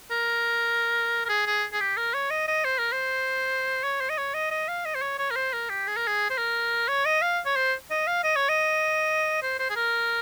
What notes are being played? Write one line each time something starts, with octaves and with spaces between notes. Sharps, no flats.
A#4
A#4
G#4
G#4
G#4
G4
A#4
C#5
D#5
D#5
C5
A#4
C5
C#5
C5
D#5
C#5
D#5
D#5
F5
D#5
C5
C#5
C#5
A#4
C5
A#4
G4
G#4
A#4
G#4
C5
A#4
C#5
D#5
F5
C#5
C5
D#5
F5
D#5
C#5
D#5
C5
C5
G#4
A#4